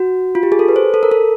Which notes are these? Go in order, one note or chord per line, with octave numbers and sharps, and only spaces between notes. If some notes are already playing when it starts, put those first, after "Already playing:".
Already playing: F#4
F4
G4
G#4
A4
B4
C5
A4
A#4
A4